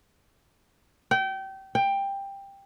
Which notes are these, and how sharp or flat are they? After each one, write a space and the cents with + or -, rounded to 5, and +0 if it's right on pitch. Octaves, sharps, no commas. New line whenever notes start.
G5 -25
G5 +15